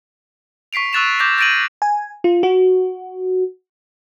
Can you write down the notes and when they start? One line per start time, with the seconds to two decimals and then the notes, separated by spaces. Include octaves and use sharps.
0.73 C#6 B6 C7 D7 F7
0.93 C#6 E6 F#6 A6 E7 F7
1.19 C#6 D6 G6 A#6 B6 F7
1.38 G6 A6 A#6 D7 D#7 F#7
1.82 G#5
2.24 F4
2.43 F#4